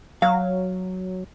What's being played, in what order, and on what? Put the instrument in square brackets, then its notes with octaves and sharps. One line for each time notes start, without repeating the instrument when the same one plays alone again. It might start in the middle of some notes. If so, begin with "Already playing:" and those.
[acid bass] F#3 [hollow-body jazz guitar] F5